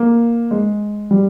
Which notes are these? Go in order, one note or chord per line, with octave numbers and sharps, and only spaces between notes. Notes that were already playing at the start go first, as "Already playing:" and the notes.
Already playing: A#3
G#3
G3